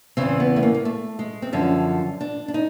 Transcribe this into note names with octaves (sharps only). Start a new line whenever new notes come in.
E2 C#3 E3 C4
B3
A3
A#3
A#3
A3
G#3
C4
F#2 D3 F3 C#4
D4
D4
D#4